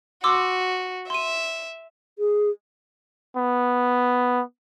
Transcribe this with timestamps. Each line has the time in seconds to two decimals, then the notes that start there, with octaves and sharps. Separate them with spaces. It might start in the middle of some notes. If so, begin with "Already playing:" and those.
0.24 F#4 C6 D6 E6
1.10 E5 C6 D#7
2.19 G#4
3.37 B3